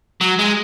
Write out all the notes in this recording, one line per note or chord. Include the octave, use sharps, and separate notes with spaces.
F#3
G#3